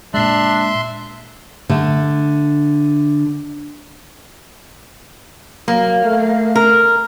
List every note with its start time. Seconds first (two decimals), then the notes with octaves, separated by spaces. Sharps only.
0.14 A#2 G#3 D4 E5 C6
1.69 D3 A3
5.68 F#3 A#3
6.05 A3
6.56 A#4